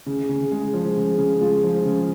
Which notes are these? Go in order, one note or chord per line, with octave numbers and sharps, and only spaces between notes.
C#3
C#3
G#3
F3
C#3
C#3
G#3 F4
F3
C#3